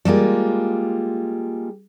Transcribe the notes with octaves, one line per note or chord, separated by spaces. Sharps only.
G3 G#3 A#3 F4